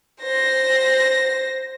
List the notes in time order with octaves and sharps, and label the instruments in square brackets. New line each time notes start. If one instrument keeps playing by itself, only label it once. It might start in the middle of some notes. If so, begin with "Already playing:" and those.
[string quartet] C5 A#6